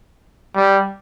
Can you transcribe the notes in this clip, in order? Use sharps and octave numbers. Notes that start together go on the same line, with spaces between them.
G3